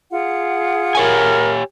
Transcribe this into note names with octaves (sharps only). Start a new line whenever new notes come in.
F4 G#4 F#5
G4 A#4 C#5 G#5